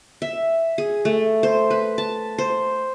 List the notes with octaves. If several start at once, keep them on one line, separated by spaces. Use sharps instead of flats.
E5
G#4
A3
C5
B4
A5
C5